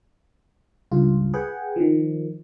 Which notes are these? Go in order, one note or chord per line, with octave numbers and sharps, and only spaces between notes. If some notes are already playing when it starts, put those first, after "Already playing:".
C#2 G2 F4
G#4 B4 F#5 G5
D#3 F3